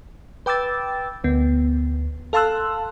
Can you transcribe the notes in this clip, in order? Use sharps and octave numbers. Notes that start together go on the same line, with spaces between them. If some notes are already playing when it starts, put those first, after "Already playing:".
B4 G5 D6 E6 A6
D2 B3
A4 F5 A5 C6 E6 F#6